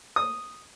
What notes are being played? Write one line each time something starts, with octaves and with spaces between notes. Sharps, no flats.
D#6